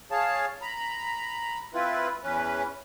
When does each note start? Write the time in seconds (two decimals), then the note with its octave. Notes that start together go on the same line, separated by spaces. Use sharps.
0.11 G#4 C#5 F5 A5
0.62 A#5 B5
1.74 C4 E4 F4 B4
2.23 E2 E3 C#4 B4